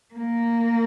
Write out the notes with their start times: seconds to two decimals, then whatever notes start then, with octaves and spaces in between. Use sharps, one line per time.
0.14 A#3